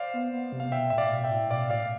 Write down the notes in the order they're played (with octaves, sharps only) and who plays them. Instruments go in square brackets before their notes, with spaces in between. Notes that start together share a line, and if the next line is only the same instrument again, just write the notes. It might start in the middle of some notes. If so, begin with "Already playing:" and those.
Already playing: [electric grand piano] C5 D5 F5
[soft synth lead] B3
B3
C3
[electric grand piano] F5
[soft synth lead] B2 [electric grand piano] E5 G5
[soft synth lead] A2 [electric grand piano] E5
[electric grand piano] D5 F5
[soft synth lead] B2
[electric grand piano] E5 G5
[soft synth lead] A2
[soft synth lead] B2 [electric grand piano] D5 F5
[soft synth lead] A2 [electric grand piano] D5 F5